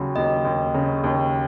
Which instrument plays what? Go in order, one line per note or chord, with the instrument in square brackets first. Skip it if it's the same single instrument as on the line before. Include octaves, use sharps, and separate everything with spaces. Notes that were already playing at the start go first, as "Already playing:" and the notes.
Already playing: [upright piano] D#2 C#3 F#3
[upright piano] D#2 [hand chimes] D#5
[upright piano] D#2
C#3
D#2